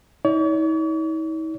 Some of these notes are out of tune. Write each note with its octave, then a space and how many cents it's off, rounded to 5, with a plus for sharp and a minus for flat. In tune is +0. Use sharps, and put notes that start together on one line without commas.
D#4 +45 C#5 +45